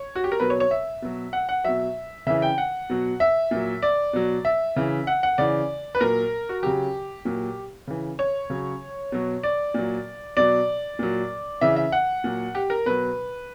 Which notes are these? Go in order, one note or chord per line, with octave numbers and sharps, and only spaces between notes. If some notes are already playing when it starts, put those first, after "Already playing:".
Already playing: C#5
F#4
G4
A#4
B2 F#3 B4
C#5
C#5
E5
B2 F#3
F#5
F#5
B2 F#3 E5
C#3 E3 E5
G5
F#5
B2 F#3
E5
A#2 F#3
D5
B2 F#3
E5
C#3 E3
F#5
F#5
C#3 E3 D5
B4
A#2 F#3 A#4
F#4
C#3 F#3 G4
A#2 F#3
C#3 E3
C#5
C#3 F#3
B2 F#3
D5
A#2 F#3
B2 F#3 D5
A#2 F#3
C#3 E3 E5
E5
F#5
A#2 F#3
G4
A#4
B2 F#3 B4